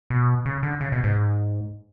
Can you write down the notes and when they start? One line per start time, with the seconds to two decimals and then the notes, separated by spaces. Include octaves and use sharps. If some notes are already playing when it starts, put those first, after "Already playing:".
0.10 B2
0.46 C#3
0.63 D3
0.81 C#3
0.92 B2
1.04 G#2